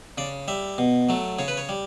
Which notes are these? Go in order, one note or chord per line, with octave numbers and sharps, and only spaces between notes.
C#3 D5
G3 E5
B2
F#3 A3
C#3 C#5
B4
C#5
G3